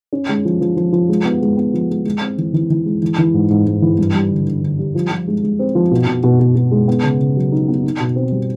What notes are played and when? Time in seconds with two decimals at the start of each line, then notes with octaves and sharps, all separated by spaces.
0.13 C#4
0.29 G#3
0.45 F3
0.61 F3
0.76 F3
0.92 F3
1.09 G#3
1.25 B3
1.42 G#3
1.57 B3
1.74 F3
1.90 G#3
2.05 G#3
2.21 C4
2.38 E3
2.53 E3
2.70 E3
2.86 G#3
3.02 E3
3.18 E3
3.34 G#2
3.50 G#2
3.67 G#2
3.82 E3
3.99 G2
4.15 G3
4.31 D3
4.46 D3
4.63 D3
4.79 G3
4.95 F3
5.11 F3
5.27 G#3
5.43 G#3
5.59 C4
5.75 F3
5.91 B2
6.07 B2
6.24 B2
6.40 B2
6.55 B2
6.71 G#3
6.88 B3
7.03 C#3
7.20 C#3
7.36 F#3
7.52 D#4
7.68 B3
7.84 D#4
8.00 B2
8.16 C4
8.32 G3